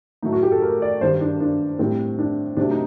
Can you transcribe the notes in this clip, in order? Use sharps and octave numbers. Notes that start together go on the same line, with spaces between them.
A2 F#3 A3 D#4
F#4
G4
A4
A#4
D5
G2 D#3 G3 C5
D4
D4
A2 G3 C4
D4
C3 F#3 A3 D4
D#4